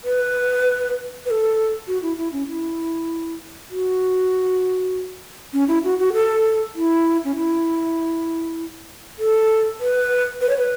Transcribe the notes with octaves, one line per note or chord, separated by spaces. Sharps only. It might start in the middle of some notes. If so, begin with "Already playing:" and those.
B4
B4
A4
F#4
E4
E4
C#4
E4
F#4
C#4
E4
F#4
F#4
A4
E4
C#4
E4
A4
B4
B4
C#5
B4